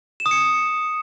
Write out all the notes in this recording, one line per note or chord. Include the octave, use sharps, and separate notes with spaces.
E7
D#6
C#7